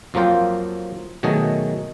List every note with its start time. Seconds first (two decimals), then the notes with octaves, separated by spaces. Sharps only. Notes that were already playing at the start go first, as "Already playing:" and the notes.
0.14 F2 F3 F#3 A#3 F4 G5
1.23 B2 D#3 F#3 A3 G#4 D#5